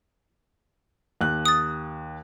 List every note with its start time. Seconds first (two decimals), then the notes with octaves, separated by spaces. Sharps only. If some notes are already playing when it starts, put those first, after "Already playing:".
1.21 D#2 F#6
1.45 D#6 A6